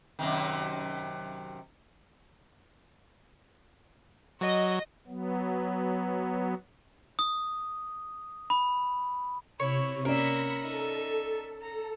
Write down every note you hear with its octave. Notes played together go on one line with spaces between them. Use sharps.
F#2 C3 D#3
F#3 D#5
F#3 B3
D#6
B5
C3 E4 C#5
A#3 C#4 A#4 D5 E5 B5 A#6 C#7
D#4 A4 E5
A4 A#5